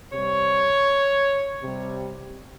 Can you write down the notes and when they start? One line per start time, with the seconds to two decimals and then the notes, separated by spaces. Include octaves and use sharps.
0.12 C3 G3 C#5
1.62 C3 G3